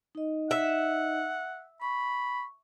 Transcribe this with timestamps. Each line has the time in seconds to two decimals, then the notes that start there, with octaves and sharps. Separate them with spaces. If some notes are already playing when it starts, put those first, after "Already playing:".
0.15 D#4 D#5
0.51 E5 F#5
1.82 B5 C#6